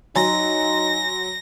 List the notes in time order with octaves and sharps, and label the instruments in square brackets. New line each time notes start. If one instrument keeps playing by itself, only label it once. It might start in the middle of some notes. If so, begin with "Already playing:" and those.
[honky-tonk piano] F#3 [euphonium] D#4 [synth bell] G#5 A#5 C6 [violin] A#6